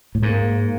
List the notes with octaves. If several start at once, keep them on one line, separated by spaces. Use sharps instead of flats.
A2
G#2 A#3